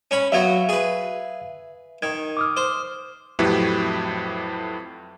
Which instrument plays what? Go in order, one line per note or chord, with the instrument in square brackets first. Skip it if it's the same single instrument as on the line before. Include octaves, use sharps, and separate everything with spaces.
[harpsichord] C#4 C#5 B5
[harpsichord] F#3 B3 F#4 [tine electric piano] E5 F5 G#6
[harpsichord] G#4 B4
[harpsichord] D#3 [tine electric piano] G#6
[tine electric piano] D6 D#6 F6
[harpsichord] C5
[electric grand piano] F2 A2 F#3 E4 G4 B4